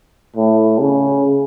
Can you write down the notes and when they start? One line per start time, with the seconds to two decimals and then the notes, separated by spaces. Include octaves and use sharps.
0.36 A2
0.80 C#3